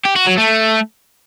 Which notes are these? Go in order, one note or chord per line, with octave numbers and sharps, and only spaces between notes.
G4
F#4
F#3
A3